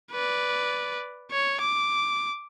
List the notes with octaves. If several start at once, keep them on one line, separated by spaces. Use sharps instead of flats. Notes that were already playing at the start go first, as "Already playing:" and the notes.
B4 D5
C#5
D6